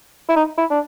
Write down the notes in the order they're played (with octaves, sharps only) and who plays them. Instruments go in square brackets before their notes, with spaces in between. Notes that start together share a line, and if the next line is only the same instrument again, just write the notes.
[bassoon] E4
D#4
E4
D4